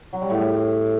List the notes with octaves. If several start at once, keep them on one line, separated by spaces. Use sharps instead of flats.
F#3
G3
A2